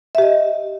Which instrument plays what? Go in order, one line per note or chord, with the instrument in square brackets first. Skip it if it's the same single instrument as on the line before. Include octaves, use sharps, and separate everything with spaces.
[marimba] E5
G4
D#5